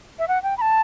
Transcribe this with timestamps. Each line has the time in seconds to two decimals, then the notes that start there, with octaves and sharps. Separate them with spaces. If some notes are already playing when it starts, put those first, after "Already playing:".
0.19 E5
0.28 F#5
0.43 G5
0.57 B5
0.61 A5